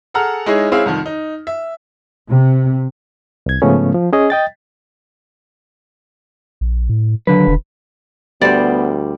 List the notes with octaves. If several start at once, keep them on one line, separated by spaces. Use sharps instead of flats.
G#4 A4 F#5 A#5 F6
G#3 D#4 E4 G#4 C#5
G#3 C4 E4 G#4 C#5 F5
C2 F2 D#3
D#4
E5
C3
C2 G#6
G#2 C#3 F3 A3 B3 C#4
F3
C#4 G#4 D#5
D#5 G5 A6
A#1
A2
D#2 D3 F#3 B4
E1
D2 G3 B3 C5 D5